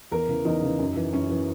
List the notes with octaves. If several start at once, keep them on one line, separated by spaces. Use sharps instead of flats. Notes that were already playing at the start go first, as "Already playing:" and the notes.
E2 A#4
C#3 E3
E2 D#4
C#3 E3
F#2
E3
F#2 C#4
E3